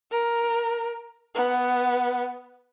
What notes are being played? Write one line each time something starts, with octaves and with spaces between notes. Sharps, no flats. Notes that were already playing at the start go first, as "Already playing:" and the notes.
A#4
B3